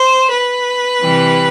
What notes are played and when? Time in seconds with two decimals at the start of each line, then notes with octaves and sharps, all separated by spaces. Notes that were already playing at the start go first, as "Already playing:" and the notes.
Already playing: C5
0.29 B4
1.01 C3 E3 G3